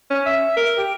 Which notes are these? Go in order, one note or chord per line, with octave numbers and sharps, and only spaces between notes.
C#4
E5
A#4
G4